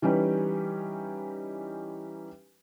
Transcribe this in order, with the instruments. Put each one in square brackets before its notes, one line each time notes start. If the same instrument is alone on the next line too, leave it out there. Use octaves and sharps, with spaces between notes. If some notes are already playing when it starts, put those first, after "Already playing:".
[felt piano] E3 G3 C#4 D#4 G4 B4